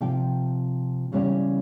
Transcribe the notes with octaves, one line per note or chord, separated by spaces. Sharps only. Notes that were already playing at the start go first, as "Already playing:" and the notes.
C3 F3 G5
E2 C#3 G3 C#4 C#5 G5